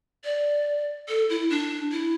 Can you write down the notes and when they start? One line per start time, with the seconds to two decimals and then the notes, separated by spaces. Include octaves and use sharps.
0.24 D5
1.08 A4
1.30 E4
1.50 D4
1.92 E4